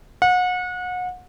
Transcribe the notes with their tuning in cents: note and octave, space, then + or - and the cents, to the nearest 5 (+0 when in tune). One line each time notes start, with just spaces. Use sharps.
F#5 -30